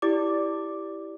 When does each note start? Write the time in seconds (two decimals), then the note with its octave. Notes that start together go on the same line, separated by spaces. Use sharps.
0.02 E4 G4 D5 D6